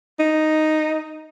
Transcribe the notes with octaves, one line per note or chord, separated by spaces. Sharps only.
D#4